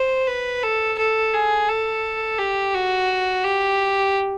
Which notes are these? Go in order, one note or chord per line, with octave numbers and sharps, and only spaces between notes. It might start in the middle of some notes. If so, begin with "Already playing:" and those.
Already playing: C5
B4
A4
A4
G#4
A4
G4
F#4
G4